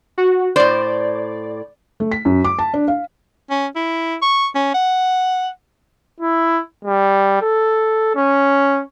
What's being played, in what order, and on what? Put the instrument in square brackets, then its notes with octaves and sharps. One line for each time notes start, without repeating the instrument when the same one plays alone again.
[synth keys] F#4
[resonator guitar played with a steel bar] A2 C5 [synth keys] D5
[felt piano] A3
B6
F#2
D6
A5
D4
F5
[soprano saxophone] C#4
E4
C#6
C#4
F#5
[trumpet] E4
G3
A4
C#4